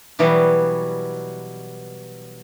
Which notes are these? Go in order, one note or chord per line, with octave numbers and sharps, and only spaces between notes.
B2 E3 F#3 G3 B3